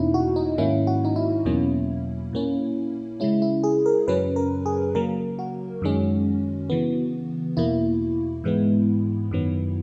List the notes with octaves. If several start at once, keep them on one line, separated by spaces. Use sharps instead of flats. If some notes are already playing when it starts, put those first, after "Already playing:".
Already playing: E2 B2 A#3 C#4 D#4 E4
F#4
D#4
G#2 D#3 A#3 C#4 E4
F#4
D#4
E4
E2 B2 F#3 A#3 C#4
A#2 A#3 C#4
C#3 G#3 C#4 E4
E4
G#4
A#4
F#2 C#3 F#3 C#4 B4
A#4
G#4
C#3 F#3 A#3 A#4
F#4
F#2 D#3 G#3 C#4
C#3 E3 B3
E2 B2 A#3 E4
G#2 E3 G#3 B3
F#2 D#3 F#3 B3